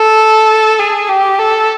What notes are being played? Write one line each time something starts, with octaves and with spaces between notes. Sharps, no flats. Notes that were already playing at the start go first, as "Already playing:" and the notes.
Already playing: A4
G#4
G4
A4